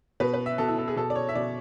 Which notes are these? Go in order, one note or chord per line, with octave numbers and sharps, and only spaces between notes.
B2 B4
B4
E5
B2 A4
E4
A4
G#4
B2 A4
D5
C#5
E5
B2 D5